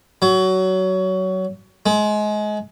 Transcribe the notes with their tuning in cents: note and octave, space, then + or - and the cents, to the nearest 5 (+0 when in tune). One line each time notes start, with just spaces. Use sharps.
F#3 +20
G#3 +25